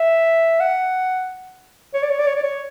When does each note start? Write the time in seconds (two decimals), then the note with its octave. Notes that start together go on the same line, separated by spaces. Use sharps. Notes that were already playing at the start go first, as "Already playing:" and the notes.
Already playing: E5
0.60 F#5
1.94 C#5
2.03 D5
2.10 C#5
2.19 D5
2.27 C#5
2.36 D5
2.43 C#5